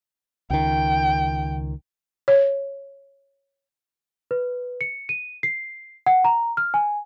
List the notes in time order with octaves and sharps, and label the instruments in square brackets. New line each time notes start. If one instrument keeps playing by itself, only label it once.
[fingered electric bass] C#2 D#3 [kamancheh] G5
[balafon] C#5
[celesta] B4
C#7
D#7
C7
F#5
A#5
F6
G#5